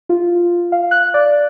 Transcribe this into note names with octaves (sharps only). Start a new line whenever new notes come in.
F4
F5
F#6
D5